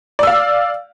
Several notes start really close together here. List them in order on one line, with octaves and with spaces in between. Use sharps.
D5 E6 F5